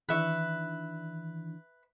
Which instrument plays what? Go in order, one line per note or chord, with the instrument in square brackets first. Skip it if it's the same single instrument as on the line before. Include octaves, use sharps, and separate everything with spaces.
[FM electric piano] D#3 E3 D4 [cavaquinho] B4 E5 C#6